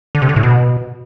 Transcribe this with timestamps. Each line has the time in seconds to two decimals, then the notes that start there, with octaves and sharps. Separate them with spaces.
0.15 D3
0.22 C3
0.29 D3
0.36 A2
0.43 B2